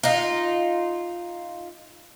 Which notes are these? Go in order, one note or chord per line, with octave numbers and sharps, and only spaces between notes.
D#4 F4